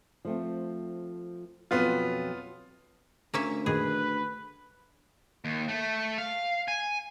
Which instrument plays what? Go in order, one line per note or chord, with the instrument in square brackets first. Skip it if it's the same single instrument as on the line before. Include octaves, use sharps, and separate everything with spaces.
[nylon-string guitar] F3 A3 C4
[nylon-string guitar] F2 B2 F#3 [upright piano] B3 F4
[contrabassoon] D2 [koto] A#3 C#4 E5
[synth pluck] F#2 A#2 D#3 [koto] G#4 [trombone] B4
[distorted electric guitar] D#2
A3
F5
G#5